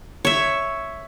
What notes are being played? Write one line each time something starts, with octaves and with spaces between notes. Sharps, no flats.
C#5 E5